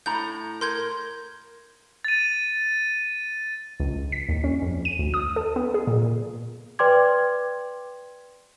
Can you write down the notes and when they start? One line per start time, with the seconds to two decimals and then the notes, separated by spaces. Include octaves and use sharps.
0.06 A2 A#5 G6
0.61 A#4 C6 G6 G#6
2.04 A6 D#7
3.80 C#2
4.12 B6
4.29 D#2
4.44 C#4
4.62 F2
4.85 D#7
4.99 D2
5.14 D#6
5.36 A4
5.56 B3
5.74 G#4
5.87 A#2
6.79 B4 D5 G5 C6 D6 G#6